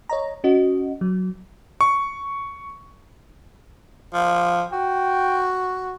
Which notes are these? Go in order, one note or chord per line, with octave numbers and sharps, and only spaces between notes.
C#5 D#5 A#5
C#4 F#4 D#5
F#3
C#6
F3
F#4 G5